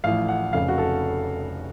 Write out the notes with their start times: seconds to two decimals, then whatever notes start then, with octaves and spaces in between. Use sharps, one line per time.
0.04 A1 A2 F3 F5
0.28 F#5
0.53 F1 F2 C#3 F5
0.68 F#4
0.78 A4